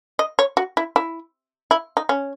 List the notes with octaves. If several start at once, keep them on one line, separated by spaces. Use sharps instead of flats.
D#5
C#5
F#4
E4
E4
E4
D#4
C#4